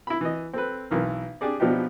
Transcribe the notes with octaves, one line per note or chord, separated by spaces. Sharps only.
E4 B5
E3 D#5
C4 A4 B4
B1 E3 A#4
D4 G4 G#4 D5
B2 F3 B3 D4 D#4 G4